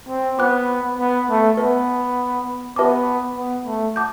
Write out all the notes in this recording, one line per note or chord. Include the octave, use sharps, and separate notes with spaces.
C4
B3 C5 G5 D6 F#6
B3
A3
B3 B4 E5 A5
B3 G4 B4 E5 A5 D6
B3
A3
F#5 A5 D6 G6